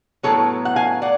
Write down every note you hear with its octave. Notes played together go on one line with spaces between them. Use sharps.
A2 F#3 B3 A4 C#5
F#5
F5 G#5
D5 F#5